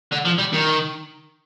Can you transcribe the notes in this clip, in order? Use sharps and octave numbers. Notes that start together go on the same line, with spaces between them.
D3
F3
G3
D#3